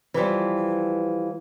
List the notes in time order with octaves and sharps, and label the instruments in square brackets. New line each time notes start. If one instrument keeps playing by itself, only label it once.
[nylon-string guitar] E3 F3 G3